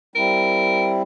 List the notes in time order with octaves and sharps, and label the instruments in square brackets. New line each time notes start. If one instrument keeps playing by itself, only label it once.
[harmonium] G3 C4 E4 [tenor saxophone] A#4